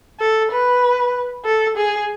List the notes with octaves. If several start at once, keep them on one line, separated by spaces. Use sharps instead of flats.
A4
B4
A4
G#4